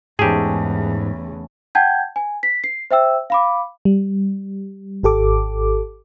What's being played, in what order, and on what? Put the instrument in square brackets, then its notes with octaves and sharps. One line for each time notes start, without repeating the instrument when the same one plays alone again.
[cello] E2 [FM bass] G#2 [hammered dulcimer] C#3 A3 [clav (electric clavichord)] G4 G#4
[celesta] F#5 G5 A5 G6 G#6
G#5
B6
C7
C5 E5 G5 E6
F5 B5 D6
[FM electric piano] G3
G#1 G4 A4 D6